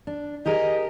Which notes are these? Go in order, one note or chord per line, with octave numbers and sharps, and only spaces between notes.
D4
G4 G#4 A#4 D#5